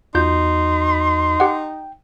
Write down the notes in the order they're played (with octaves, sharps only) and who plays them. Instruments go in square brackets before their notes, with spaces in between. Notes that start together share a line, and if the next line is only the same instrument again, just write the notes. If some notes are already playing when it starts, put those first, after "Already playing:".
[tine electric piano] E2 F#4 [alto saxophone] D#4 [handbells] F4 G6 [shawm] C6
[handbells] G4 F#5 [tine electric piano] G5